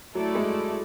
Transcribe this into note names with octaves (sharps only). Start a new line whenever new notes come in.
F#3 A3 E4 A4 D5
G#3